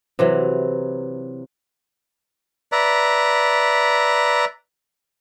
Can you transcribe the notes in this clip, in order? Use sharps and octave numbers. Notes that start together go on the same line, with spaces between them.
C3 E3 F#3
B4 D5 E5 A#5